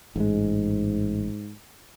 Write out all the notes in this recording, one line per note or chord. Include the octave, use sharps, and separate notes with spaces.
A1 G#2 G#3